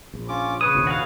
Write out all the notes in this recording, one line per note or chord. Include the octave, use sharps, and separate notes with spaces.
A#1
C#4 F4 D6
C#3 B4 C#5 D#6
F1 A#1 D#2
F#4 G#4 F5